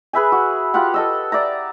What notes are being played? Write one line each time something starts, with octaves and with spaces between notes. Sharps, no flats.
G#4 B4 E5 G#5
F#4
F4 G4 F5 F#5
A4 D#5 E6
D5 E5 A#5